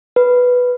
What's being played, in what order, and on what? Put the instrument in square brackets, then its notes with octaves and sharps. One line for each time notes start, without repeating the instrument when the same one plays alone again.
[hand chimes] B4